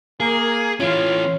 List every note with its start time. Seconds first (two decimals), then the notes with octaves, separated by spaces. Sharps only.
0.20 A#3 G#4
0.80 E3 C#4 F4 C#5